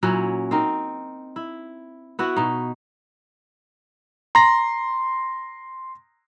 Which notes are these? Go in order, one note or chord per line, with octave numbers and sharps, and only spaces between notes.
A#2 F#3 C#4 E4
C4 D#4 A#4
E4
B3 E4 F#4
B2 D#4
A#5 C6 A#6